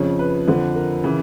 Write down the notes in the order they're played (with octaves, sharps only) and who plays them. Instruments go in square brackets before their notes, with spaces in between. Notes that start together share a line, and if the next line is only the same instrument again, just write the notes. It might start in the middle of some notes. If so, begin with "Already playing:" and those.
Already playing: [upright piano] F2 C#3 F3 C#5
B4
F2 D3 F3
A#4
C#3 E3